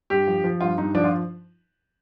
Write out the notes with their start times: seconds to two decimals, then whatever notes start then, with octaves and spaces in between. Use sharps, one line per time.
0.10 G2 G4
0.27 F3
0.44 F3
0.61 G2 F4
0.78 G2 D#4
0.95 F3 D4
1.04 F4